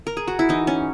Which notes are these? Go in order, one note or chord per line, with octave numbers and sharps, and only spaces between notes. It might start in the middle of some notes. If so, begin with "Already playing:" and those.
A#4
G#4
F#4
E4
E3 D#4
C#4